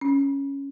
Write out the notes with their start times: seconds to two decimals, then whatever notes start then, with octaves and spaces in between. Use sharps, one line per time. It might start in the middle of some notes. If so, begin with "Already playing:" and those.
0.01 C#4